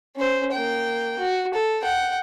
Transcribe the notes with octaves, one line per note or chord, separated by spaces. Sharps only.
C#4 C5
A#3 G5
F#4
A4
F#5 G5